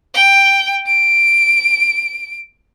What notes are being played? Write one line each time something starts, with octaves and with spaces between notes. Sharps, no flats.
G5
D7